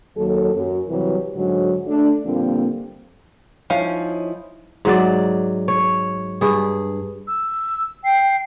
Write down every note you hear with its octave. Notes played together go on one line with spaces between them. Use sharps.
D#2 F#3 A4
F#2
C3 E3 F#3 G3
G#2 D3 F#3
A3 D4
A#2 D3 F3 G3 A#3 C4
F3 C#4 D#4 E4 F5
G#2 F#3 D5
C#5
G2 G#4
E6
G5 C7